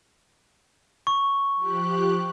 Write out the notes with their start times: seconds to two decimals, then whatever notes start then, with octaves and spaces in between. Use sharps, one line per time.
1.07 C#6
1.57 F3 G4 F#6